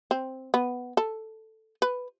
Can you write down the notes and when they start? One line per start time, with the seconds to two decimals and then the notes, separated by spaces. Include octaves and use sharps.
0.11 C4
0.54 B3
0.97 A4
1.82 B4